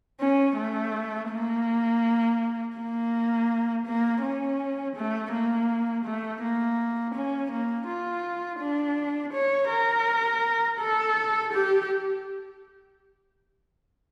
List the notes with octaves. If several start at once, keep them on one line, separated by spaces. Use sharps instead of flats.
C#4
A3
A#3
A#3
A#3
C#4
A3
A#3
A3
A#3
C#4
A#3
F4
D4
C#5
A#4
A4
G4